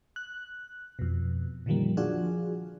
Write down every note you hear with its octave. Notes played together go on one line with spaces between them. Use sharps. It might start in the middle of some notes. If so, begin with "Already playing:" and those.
F#6
F2 B2
A#2 D3 D#3 F3 G3 A#3
F3 D4 F4 F#4 G#4